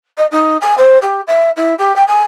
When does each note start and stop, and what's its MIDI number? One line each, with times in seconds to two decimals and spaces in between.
0.17 0.26 75
0.31 0.57 63
0.61 0.74 80
0.78 0.98 72
1.02 1.21 67
1.27 1.50 76
1.57 1.74 64
1.78 1.94 67
1.96 2.03 79
2.07 2.22 80